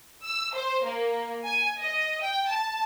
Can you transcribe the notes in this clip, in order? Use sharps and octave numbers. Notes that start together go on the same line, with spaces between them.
E6
C5
A#3
G#5
D#5
G5
A5